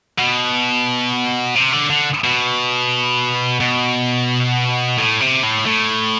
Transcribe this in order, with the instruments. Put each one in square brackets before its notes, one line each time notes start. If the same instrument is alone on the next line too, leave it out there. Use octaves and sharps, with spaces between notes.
[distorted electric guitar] B2
C3
D3
D3
B2
B2
A2
C3
A2
A2